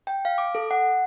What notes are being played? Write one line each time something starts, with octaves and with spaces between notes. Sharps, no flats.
G5
F5
D6
A4
F#5